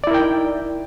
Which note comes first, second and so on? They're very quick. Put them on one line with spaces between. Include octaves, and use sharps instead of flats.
D5 E4 A#4 G5 D#4